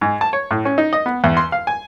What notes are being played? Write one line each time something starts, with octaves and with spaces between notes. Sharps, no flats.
G#2
A5
C#5
A2
C#4
D#4
D#5
B3
E2
C6
F5
G#5